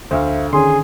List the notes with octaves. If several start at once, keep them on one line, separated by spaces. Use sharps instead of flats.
D2 C5 E5 F5
D3 D#3 C#4 G#4 C6